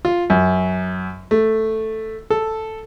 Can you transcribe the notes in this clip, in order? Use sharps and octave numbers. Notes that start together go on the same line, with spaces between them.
F4
F#2
A3
A4